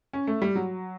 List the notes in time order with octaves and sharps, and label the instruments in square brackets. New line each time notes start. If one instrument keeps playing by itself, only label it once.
[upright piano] C#4
A3
G3
F#3